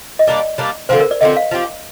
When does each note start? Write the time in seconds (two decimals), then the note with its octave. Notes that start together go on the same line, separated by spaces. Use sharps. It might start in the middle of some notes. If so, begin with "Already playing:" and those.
0.19 D#5
0.27 G3 A#3 D4 D5
0.58 G3 A#3 D4
0.89 D3 F3 C4 C5
1.00 A#4
1.11 D5
1.21 D3 F3 C4 D#5
1.37 F5
1.51 F3 C4 G4